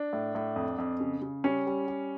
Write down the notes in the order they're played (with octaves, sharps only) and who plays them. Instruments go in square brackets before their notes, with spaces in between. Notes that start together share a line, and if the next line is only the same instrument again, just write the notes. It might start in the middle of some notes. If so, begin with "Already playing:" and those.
Already playing: [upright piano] D4
A2
A2
F2
F2
C#3
C#3
G3 C#4
G3
G3